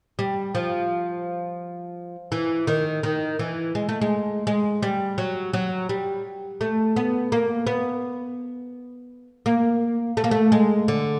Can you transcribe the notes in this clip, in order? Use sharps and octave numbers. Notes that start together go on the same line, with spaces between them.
G3
F3
E3
D#3
D#3
E3
G#3
A3
G#3
G#3
G3
F#3
F#3
G3
A3
B3
A#3
B3
A#3
A3
A#3
A3
G#3
D3